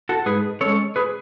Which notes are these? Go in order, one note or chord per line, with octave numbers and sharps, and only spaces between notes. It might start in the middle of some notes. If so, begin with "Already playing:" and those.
F#4 A4
G#2 G#4 B4
G#3 C#4 A4 C#5
G#4 B4